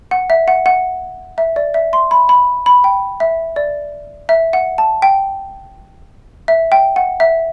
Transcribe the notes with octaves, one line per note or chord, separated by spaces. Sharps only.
F#5
E5
F#5
F#5
E5
D5
E5
C6
B5
B5
B5
G5
E5
D5
E5
F#5
A5
G5
E5
G5
F#5
E5